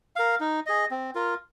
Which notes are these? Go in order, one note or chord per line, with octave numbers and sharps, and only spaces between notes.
A#4 F5
D#4
G#4 D#5
C4
F4 A#4